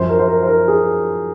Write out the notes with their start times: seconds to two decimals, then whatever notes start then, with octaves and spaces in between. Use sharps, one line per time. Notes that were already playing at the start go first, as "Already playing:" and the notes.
Already playing: F#2 F3 C5
0.09 A#4
0.19 C5
0.29 A#4
0.43 C5
0.47 A#4
0.68 G#4